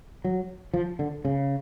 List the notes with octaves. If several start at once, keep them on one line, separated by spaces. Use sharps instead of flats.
F#3
F3
D3
C#3